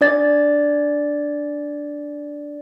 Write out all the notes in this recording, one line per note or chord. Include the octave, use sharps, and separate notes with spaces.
D4 D5 A6